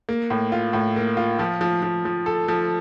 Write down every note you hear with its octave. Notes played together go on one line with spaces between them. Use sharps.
A#3
A2
F4
A2
A#3
F4
F3
F3
F3
F3
A4
F3